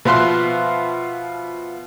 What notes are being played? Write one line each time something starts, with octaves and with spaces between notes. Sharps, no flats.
B2 F3 F4 E5 C6 F#6